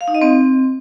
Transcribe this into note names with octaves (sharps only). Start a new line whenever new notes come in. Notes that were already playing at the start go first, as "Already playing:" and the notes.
F5
D#4
D#5
C4